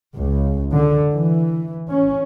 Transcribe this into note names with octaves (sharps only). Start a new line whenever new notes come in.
C#2
D3
E3
C#4